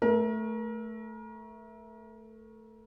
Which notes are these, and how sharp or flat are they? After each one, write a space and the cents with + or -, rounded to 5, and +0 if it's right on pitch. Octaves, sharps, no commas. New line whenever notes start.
A3 +0 A#4 +30